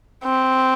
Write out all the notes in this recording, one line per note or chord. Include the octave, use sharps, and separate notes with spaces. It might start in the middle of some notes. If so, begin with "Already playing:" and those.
C4